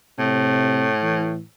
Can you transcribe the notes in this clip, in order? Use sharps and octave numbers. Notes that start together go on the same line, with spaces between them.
A2 C3
E3